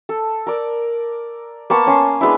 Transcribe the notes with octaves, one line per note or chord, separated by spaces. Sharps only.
A4
A#4 D5
A#3 B3 A5 C#6
C#4 G#5 C6
G#3 B3 D4 E4